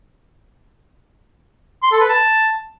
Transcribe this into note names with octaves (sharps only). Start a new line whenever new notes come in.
C6
A4
B4
A5